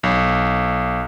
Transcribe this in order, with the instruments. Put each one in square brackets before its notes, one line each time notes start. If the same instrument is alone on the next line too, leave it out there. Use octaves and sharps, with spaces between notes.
[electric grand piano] B1